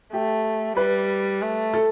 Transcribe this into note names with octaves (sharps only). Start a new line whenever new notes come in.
A3 G4
G3 B4
A3
A4